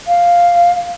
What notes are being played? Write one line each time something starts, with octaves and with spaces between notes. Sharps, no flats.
F5